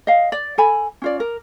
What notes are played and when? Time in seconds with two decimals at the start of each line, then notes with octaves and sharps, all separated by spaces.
0.07 D#5 F5
0.32 D5
0.58 A4 G#5 B5
1.02 C#4 F4 D5
1.20 A#4